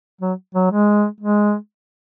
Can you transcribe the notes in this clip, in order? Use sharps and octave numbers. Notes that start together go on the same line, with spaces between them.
F#3
F#3
G#3
G#3